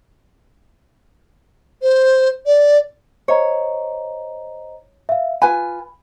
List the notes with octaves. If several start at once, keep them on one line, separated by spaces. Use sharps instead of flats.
C5
D5
C5 C#5 D#5 A#5
E5 F5
F4 B4 G#5 B5